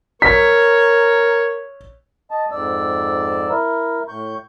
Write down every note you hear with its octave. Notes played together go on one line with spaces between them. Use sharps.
A#4 C#5 B6
D#5 A5
F2 G#2 D5 E6
E4 A#4
A2 C#6 G6